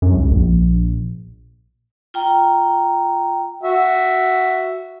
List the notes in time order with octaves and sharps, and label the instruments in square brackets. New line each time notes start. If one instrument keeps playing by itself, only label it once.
[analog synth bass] F#2
C#2
A#1
[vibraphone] F4 G5 A#5
[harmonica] F#4 E5